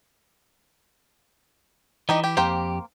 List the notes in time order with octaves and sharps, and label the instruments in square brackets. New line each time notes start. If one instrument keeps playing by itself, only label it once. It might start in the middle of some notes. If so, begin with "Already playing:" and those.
[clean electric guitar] E3 [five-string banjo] D#4 G4 D#5
[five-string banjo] G4
[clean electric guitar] F2 G4 [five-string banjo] A#3 C5 G5